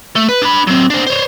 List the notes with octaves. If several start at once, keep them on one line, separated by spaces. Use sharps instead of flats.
A3
B4
D4 B5
F#3 C4
D4 C5
C5 C#5